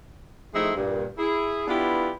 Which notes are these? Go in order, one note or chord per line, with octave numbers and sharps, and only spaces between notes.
F3 A3 C4 D#4 E4 G#4
G2 A#2
E4 G#4
B3 D4 E4 F4 G4 B4